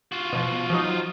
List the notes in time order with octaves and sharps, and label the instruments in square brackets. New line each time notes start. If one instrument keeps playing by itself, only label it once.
[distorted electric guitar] F4 F#4
[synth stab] B2 F3
F3 F#3 D#4